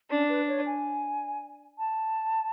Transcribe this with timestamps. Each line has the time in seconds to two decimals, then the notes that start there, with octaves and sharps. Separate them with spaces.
0.10 C#4 D4
0.29 B4
0.48 C#5
0.66 G#5
1.79 A5